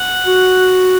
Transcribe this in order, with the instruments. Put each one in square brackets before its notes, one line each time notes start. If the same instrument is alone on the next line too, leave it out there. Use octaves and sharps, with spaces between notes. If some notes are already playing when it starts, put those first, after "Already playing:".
Already playing: [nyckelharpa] F#5
[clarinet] F#4